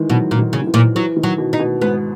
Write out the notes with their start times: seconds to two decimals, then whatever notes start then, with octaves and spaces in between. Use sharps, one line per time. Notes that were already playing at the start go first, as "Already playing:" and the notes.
Already playing: D#3 E3 G#3
0.09 B2 F#3
0.31 A#2
0.39 D#3
0.53 C#3
0.62 D#3
0.67 E3
0.74 A#2
0.95 E3 F#3
1.16 D#3
1.23 F#3
1.38 B2
1.53 D#4
1.60 B2
1.81 G#2 B3